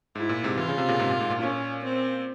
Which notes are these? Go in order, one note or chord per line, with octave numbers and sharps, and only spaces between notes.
G#2 E4
A#2
G#2 C3
E3 F4
C#3
C3
A#2 C#3
G#2 C3
A#2
G#2
A#2
C#4
C4